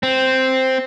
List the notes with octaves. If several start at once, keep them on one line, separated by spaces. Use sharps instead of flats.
C4